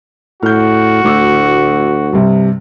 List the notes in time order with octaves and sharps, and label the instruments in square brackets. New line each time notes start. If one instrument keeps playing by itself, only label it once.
[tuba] A2 [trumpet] F#4 [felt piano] F6 G6
[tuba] D2 [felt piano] A2 D6 E6
[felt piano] G2 C3 G3